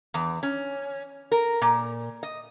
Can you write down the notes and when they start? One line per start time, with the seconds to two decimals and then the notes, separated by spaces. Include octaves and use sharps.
0.14 E2
0.43 C#4
1.32 A#4
1.62 A#2
2.23 D#5